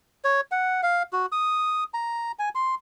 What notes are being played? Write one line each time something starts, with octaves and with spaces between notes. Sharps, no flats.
C#5
F#5
F5
F#4
D#6
A#5
G#5
C6